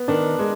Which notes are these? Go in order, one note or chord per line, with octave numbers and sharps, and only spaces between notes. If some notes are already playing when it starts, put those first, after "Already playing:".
Already playing: B3
D#3 D4
D#3 G#3